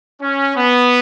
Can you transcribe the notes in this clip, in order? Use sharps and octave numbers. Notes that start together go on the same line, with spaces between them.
C#4
B3